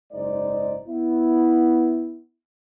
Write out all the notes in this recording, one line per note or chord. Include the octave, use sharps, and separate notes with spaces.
F#1 G#2 G#3 D#4 C5 D5
B3 E4